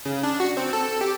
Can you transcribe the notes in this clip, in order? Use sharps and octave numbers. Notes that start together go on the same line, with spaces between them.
C#3
D4
F#4
C4
A4
G4